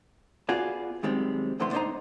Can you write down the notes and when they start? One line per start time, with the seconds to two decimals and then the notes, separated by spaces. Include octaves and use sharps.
0.49 B3 F4 F#4 G#4 D5
1.03 F#2 D#3 G3 G#3 C4
1.60 F2 A2 D3 B3 C5 C6
1.72 B3 D4 D#4 C5 D#5 A#5